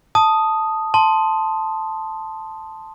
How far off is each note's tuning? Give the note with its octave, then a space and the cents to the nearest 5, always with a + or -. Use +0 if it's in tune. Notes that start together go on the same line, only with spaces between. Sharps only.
A5 +0 D#6 +0
A5 +0 C6 +0